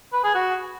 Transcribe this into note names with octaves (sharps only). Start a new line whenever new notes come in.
B4
G#4
F#4